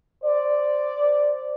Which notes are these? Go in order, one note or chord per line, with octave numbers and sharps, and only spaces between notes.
C5 D5